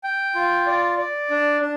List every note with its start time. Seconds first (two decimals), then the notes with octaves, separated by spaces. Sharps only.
0.04 G5
0.35 F4
0.66 D5
0.98 D5
1.30 D4
1.61 D4